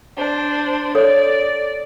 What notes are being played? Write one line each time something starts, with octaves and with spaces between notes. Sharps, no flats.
D4 C5
A4 C#5 D5